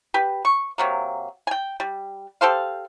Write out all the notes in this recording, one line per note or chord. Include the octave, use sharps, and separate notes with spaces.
G4 B4
C#6
C3 F#3 A#3
G5 G#5
G3
G4 A4 C5 F5